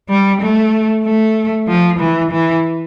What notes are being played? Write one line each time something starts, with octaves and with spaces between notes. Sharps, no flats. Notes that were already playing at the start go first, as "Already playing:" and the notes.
G3
A3
A3
F3
E3
E3